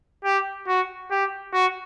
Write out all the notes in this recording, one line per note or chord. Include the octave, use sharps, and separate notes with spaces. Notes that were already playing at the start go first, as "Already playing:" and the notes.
G4
F#4
G4
F#4